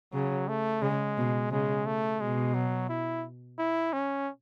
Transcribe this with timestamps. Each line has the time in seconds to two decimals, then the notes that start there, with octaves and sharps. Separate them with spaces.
0.13 C#3 F#3
0.49 A3
0.82 C#3 G#3
1.18 B2
1.51 C#3 G#3
1.86 A3
2.21 B2 G#3
2.55 F#3
2.89 E4
3.59 E4
3.93 C#4